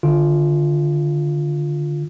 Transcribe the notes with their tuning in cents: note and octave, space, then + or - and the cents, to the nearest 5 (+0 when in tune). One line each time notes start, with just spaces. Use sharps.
D3 +5 F4 +0